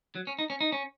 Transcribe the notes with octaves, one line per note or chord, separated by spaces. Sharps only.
F#3
C#4
D#4
C#4
D#4
C#4